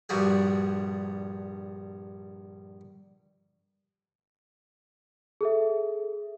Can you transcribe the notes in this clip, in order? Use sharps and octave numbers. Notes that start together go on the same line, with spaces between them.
A#1 G2 G3 F#4 G#4
G#4 A4 E5